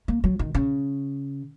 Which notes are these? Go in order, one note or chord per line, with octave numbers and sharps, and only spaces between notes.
A#3
F#3
D#3
C#3